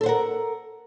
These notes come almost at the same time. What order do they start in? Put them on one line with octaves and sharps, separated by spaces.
A4 C5 F#5 A#4